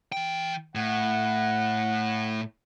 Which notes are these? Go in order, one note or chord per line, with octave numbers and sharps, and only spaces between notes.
E3 G5
A2 F#5